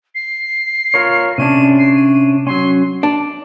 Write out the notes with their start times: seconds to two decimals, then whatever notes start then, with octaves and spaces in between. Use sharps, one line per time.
0.15 C7
0.94 F4 A#4 C#5
1.38 C3 C#4 D4 D#7
1.78 C7
1.95 D#7
2.47 F#3 C#4 C6
3.03 D4